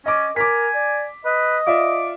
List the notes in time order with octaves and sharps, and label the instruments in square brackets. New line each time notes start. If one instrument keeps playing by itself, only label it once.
[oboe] C#4 [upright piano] D#5 D6
[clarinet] A#4 [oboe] G#5 [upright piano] D6 B6
[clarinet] D5
[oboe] B4 [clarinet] D#5
[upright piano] F4 D5 E5 [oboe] D6